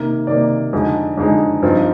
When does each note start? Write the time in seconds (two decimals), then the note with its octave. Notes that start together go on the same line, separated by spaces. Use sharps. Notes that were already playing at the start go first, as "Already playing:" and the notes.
Already playing: C3 D#3 A#3 D#4
0.27 C3 D#3 A#3 D#4 D5
0.73 F2 D3 G#3 D#4
1.17 F2 D3 G#3 D#4
1.62 G2 F3 C4 D#4